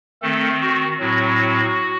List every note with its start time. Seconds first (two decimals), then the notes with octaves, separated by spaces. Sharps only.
0.22 D#3 A3 C4 A4
0.62 F#4
0.99 A2 F#3 C4 F#4